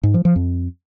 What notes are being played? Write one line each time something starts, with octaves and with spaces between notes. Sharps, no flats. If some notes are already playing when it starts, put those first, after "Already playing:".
G#2
F3
F3
F2